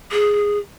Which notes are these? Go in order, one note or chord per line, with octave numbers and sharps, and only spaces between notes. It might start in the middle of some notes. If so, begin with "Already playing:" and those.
G#4